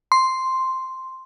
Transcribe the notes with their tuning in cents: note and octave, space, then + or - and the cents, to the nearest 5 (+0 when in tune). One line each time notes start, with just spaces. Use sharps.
C6 +0